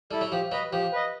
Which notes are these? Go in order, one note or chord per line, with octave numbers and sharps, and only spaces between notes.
G3 E4 A4
F#3
F3 G4
F#3 B4 D#5
F3 G4
B4 D#5